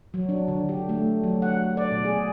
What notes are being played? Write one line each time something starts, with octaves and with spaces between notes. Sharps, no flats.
F#3
D4
D3
G4
A3
F#3
F#5
D5
B2
G#4